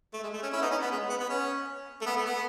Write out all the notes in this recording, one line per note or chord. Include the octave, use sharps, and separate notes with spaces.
A3
G#3
A3
C#4
C#4 E4
B3 D#4
C#4
B3
G#3
B3
B3
C#4
A3
B3
A3
B3